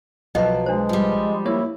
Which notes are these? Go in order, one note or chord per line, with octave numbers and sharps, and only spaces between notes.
B1 F3 F#3 B4 D#5 A5
G#3 D4 C5
F3 G3
A#3 E4 C#5